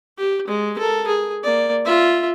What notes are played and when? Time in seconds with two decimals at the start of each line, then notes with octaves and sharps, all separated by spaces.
0.18 G4
0.47 G#3
0.78 A4 A#4
1.07 G#4
1.43 A#3 D5
1.85 F4 E5